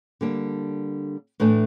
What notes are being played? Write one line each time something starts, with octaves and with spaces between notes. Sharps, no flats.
D3 G3 A#3 D4
A2 E3 A3 D4